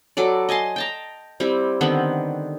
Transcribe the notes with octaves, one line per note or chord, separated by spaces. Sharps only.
F#3 A4 B4 D5
D#5 G#5 A5 C6
G5 A5 A#5
G3 C4 E4
D3 D#3 B3 C4